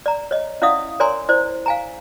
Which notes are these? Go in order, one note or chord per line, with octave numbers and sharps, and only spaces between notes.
D5 A#5
C#5 D#5
C#4 E4 D5 E5 F5 D#6
A#4 C#5 D5 G#5 A#5 C6
E4 C5 D5
F5 G#5 A#5